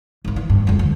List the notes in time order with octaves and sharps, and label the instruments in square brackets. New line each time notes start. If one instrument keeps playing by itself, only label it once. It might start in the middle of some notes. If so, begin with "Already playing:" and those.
[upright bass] G#1 G#2
E3
G2
F2 G#3
D2